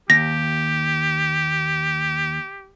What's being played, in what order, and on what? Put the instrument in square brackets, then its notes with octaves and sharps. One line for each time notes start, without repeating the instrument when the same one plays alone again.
[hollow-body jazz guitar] D#2 [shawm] G4 [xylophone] A#6